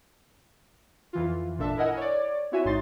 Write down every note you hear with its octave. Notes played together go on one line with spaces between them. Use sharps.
F2 E3 F4
G#1 A#2 D4 A4 E5 A5
E4 A#4 D#5 F#5 G#5 E6
C#5 D5
C4 E4 F#4 C#5 E5 G#5
A1 G#2 D#4 C6 A6